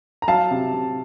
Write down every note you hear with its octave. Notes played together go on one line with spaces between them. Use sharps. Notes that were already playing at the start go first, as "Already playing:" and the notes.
A#5
F#3 F5 A5
C3
C3